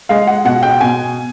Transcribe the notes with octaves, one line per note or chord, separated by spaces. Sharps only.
G#3 F5
F#5
B2 F#5
G5
B2 G#5